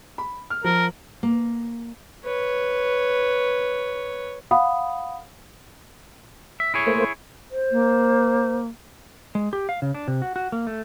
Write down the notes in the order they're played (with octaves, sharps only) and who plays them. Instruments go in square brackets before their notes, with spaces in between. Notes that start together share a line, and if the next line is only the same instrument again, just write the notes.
[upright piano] B5
F6
[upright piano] F3 [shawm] A#4
[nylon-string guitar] A#3
[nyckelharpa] B4 C#5
[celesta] F5 F#5 B5 D#6
[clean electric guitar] E5
E4 G#4 C#5
[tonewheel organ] A3 A#3 C5
[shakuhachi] C5
[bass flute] A#3
[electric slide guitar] G#3
G4
F5
C#3
D4
C3
F#4
F#4
A#3
A3